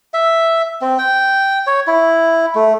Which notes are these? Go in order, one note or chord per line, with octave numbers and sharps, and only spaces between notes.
E5
C4
G5
C#5
E4
A3